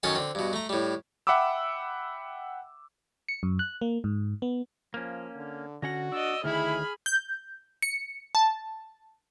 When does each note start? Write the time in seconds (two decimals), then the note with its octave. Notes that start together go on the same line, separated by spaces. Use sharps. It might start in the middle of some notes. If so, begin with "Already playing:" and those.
0.03 F#2 D#3 C#4 A4 G#5 A5
0.16 D3 C4
0.35 G2 B2
0.53 A3 A#5
0.69 A2 G3
1.27 E5 F#5 G5 B5 D6 E6
3.28 C#7
3.43 F#2
3.59 F#6
3.81 A#3
4.04 G#2
4.42 B3
4.94 F3 A#3 C#4
5.35 D3
5.82 D3 C#4 F#4 F#5 A#6
6.12 D4 D5 D#5 E6
6.44 D2 D#3 E4 G#4 B5 F6
7.06 G6
7.82 C#7
8.35 A5